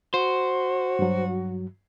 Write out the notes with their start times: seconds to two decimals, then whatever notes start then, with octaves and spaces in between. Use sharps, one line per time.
0.14 F#4 C5
0.99 G2 F#3